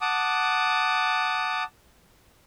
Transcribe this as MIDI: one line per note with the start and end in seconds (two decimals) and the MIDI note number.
0.01 1.64 78
0.01 1.64 81
0.01 1.64 86
0.01 1.64 87